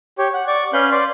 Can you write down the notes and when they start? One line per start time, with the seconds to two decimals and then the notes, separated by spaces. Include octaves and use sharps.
0.18 G4 C#5
0.34 F#5
0.47 D5 C#6
0.73 C#4 B4 F5 F#6 G6
0.91 B4 D5 B5 C6